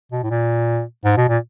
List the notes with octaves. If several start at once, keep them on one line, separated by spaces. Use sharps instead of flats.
B2
A2
A#2
G#2
B2
A#2